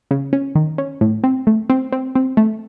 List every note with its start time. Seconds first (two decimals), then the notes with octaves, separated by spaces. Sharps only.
0.11 C#3
0.33 C#4
0.55 D#3
0.78 C#4
1.01 A2
1.24 C4
1.47 A3
1.70 C4
1.92 C4
2.15 C4
2.37 A3